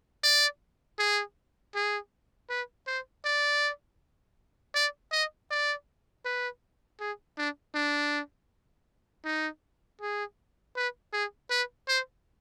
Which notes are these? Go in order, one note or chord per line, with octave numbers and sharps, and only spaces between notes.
D5
G#4
G#4
B4
C5
D5
D5
D#5
D5
B4
G#4
D4
D4
D#4
G#4
B4
G#4
B4
C5